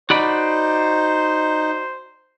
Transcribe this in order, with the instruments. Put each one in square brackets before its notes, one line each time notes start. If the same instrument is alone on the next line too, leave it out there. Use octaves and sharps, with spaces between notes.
[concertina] D#4 [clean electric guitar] F#4 D5 B5 [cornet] C5